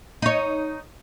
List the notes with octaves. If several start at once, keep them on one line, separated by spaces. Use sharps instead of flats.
D#4 C#5